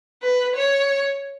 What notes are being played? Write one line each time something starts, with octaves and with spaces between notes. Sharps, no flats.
B4
C#5